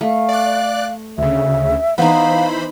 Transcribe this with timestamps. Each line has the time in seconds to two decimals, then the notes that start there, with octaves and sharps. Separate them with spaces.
0.01 A3 F5
0.29 D5 F#6
1.18 D2 C#3 E5
1.98 E3 B3 D#4 C5 F5 B5